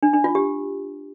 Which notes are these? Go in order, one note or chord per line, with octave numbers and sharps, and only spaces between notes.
D4
D4
F4
G4